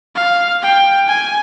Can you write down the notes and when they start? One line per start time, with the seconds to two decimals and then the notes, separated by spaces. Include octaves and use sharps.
0.15 F5
0.62 G5
1.07 G#5